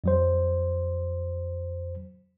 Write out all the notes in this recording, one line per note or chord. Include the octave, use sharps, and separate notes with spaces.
F2 F#3 C5